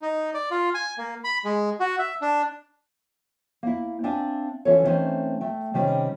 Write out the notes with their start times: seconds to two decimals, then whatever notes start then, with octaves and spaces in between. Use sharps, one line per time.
0.02 D#4
0.34 D5
0.51 F4
0.74 G#5
0.98 A#3
1.24 B5
1.44 G#3
1.80 F#4
1.99 E5
2.21 D4
3.63 A#3 E4
4.04 C4 D4 E5 F5 G#5
4.65 E3 C#4 F4 A4 B4 C#5
4.84 E3 G3 A3 C4 C#4 D#4
5.41 A3 G5
5.74 C3 D#3 G3 C#4